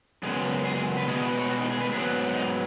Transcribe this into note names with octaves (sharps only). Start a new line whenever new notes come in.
F#2 C#3 G#3 B3 G#4
G#4
G#4
B4
B2 G#3 B3 G#4
G#4
B4
C#5
F#4
D#4
G#4
B4
G#2 F#3 B3 G#4
D#4